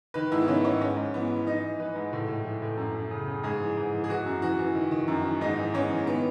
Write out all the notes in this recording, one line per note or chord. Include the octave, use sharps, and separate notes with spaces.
D#3 B4
G#2 E4
B3
D#3 C#4
G#2 C#4
G#2 C#4
G#2
E3 B3
E3
E3 D#4
E3
E3 B4
G#2
A2
A2
E3
A2
F#2
F#2
C#3
C#3
G#2 G#4
E3
G#2
E3
G#4
E3 F#4
F#2
E3 F#4
E3
D#3
D#3
F#2
D#3
G#2 D#4
E3
G#2 C#4
E3
D#3 B3